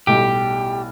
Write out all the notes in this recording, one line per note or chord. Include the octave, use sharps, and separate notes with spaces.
B1 A2 G3 G4